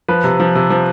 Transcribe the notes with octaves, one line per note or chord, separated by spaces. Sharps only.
F3 B4
C3
F3
C3
F3